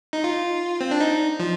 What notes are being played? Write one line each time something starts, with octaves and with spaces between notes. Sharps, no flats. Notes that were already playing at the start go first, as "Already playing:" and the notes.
D#4
F4
C4
D4
D#4
F3